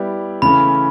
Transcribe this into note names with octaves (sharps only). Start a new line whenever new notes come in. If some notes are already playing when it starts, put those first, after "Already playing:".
Already playing: G3 B3 E4 G4 D5
C#3 E3 A3 C#4 B5